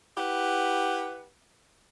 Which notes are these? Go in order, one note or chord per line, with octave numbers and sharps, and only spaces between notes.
E4 G4 B4 F#5